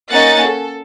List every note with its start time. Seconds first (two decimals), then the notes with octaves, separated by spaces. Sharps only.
0.11 A#3 C#4 D#4 F#5 A6
0.44 A4